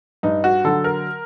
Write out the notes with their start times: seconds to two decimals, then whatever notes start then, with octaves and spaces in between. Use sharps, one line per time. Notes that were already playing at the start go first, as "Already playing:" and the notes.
0.23 G2 D#4
0.44 F#4
0.64 D3 F#3 A4
0.84 A#4